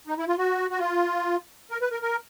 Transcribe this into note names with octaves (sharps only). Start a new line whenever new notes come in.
D#4
E4
F4
F#4
F#4
F4
A#4
B4
A#4
A#4